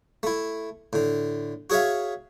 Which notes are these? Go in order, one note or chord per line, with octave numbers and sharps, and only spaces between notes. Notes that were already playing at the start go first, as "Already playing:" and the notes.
A3 E4
A2 D3
F#4 G#4 C#5 E5 F5